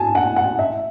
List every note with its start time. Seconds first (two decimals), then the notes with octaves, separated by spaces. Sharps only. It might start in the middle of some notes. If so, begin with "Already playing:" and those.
Already playing: G#5 A5
0.15 F#5
0.36 F#5
0.59 E5